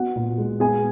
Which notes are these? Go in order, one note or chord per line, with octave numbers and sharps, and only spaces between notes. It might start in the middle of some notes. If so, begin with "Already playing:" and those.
Already playing: B3 F#4 F#5
A#2
G#3
B3 G#4 G#5